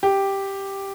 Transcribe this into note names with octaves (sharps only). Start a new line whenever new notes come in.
G4